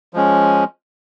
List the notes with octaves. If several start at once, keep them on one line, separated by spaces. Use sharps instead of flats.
F3 G#3 C#4